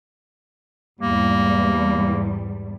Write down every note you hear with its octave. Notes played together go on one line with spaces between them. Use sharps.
E2 G#2 G3 A#3